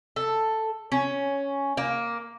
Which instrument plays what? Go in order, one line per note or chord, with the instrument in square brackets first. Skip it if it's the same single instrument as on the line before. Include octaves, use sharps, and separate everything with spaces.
[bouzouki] A4
C#4
A#3